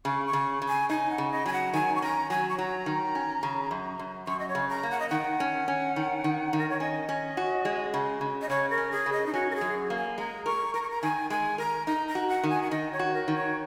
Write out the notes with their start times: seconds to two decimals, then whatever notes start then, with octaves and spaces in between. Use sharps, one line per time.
0.05 C#3 C#6
0.27 C#6
0.33 C#3
0.62 C#3
0.68 G#5
0.90 D#4 G#5
1.11 F#5
1.18 C#3
1.32 D#5
1.46 F#3 G#5
1.53 F#5
1.74 D#3 G#5
1.96 C#6
2.02 C#4 A#5
2.30 F#3 G#5
2.49 C#6
2.58 F#3 A#5
2.86 D#3
3.15 C#4
3.43 C#3
3.71 F#2
3.99 F#2
4.27 F#2 C#6
4.39 D#5
4.49 C#5
4.55 C#3
4.69 A#5
4.83 A#3
4.91 F#5
5.00 D#5
5.09 D#3 F#5
5.40 C#4
5.68 C#4
5.96 D#3
6.24 D#3
6.53 D#3
6.58 A#4
6.69 C#5
6.80 C#4 D#5
7.09 C#4
7.37 F#4
7.65 G#3
7.94 C#3
8.21 C#3
8.41 D#5
8.49 C#3 C#5
8.70 A#4
8.78 C#4
8.91 G#4
9.06 C#3
9.13 D#5
9.26 D#4
9.34 C#4 F#4
9.50 A#4
9.55 G#4
9.61 F#2
9.90 A#3
9.97 G#5
10.18 G#3 A#5
10.46 A#4 C#6
10.74 A#4 A#5
10.83 C#6
10.90 A#5
11.02 D#3 G#5
11.30 G#3 G#5
11.58 A#4 A#5
11.87 D#4 A#5
12.08 A#5
12.15 F#4
12.29 F#5
12.43 D#3
12.50 G#5
12.62 F#5
12.71 D#3 D#5
12.93 C#5
12.99 F#4
13.14 A#4
13.28 D#3
13.35 C#5